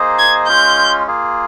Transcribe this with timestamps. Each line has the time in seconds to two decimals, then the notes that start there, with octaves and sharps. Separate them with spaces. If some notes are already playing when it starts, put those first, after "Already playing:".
Already playing: A#3 D#4 G#4 C5 D#5
0.19 G#6
0.48 G#3 C#4 F4 G6
1.07 A#3 F4 G#4